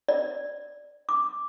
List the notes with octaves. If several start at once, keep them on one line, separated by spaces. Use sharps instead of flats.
D5
D6